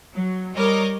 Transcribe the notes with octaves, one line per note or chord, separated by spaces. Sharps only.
F#3
G3 A#4 C#5 D#5 D6